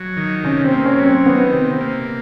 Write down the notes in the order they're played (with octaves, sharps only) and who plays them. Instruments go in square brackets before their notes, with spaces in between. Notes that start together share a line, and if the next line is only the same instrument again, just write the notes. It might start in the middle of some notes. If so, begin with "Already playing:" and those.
Already playing: [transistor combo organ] F#3
D#3
[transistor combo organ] C3 [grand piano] C#4
[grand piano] C4
[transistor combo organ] A#3
[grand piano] C#4
[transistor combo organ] F#3
[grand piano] C4
[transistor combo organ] D#3 [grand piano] B3
[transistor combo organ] C3 [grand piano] C4
[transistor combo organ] A#3